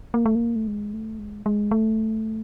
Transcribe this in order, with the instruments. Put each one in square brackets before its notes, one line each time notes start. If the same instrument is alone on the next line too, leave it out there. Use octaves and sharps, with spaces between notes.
[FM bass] A#3
A3
A#3
A3
G#3
A3
G#3
G#3
A3